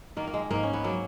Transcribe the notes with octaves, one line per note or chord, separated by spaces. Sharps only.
D#3 A#3
A#3
G#3
G#2 A#3
C#4
B3
F#3 A#3